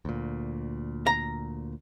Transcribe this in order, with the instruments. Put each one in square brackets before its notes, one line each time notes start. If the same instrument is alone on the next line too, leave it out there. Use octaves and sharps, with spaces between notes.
[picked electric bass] D2 A#2
[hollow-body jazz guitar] A#5